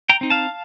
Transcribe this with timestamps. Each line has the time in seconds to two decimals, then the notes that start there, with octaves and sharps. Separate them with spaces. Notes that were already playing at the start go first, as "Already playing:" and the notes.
0.09 G5 A#5
0.21 C4 D#4
0.30 F5 A5